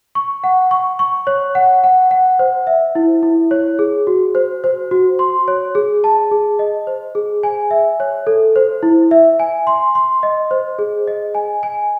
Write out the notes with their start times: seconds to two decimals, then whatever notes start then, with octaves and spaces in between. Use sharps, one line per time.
0.15 C#6
0.44 F#5
0.71 C#6
0.99 C#6
1.27 C#5
1.55 F#5
1.84 F#5
2.11 F#5
2.39 C5
2.67 E5
2.95 E4
3.23 E4
3.51 C#5
3.79 G#4
4.07 F#4
4.35 C5
4.64 C5
4.91 F#4
5.19 C6
5.48 C#5
5.75 G#4
6.04 A5
6.31 G#4
6.59 D#5
6.87 C5
7.15 G#4
7.43 G#5
7.71 E5
8.00 C#5
8.27 A4
8.56 C5
8.83 E4
9.11 E5
9.40 G#5
9.67 C6
9.95 C6
10.23 D#5
10.51 C5
10.79 G#4
11.07 D#5
11.35 G#5
11.63 G#5